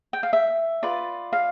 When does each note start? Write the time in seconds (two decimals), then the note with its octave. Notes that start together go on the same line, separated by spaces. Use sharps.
0.13 G5
0.23 F5
0.33 E5
0.83 F4 B4 D5
1.33 F5